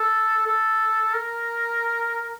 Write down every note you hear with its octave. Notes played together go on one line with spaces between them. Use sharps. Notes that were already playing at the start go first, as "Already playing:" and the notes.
Already playing: A4
A4
A#4